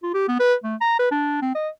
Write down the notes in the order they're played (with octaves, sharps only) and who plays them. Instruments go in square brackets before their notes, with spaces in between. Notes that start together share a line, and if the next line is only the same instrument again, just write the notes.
[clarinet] F4
G4
B3
B4
A3
A#5
B4
D4
C4
D#5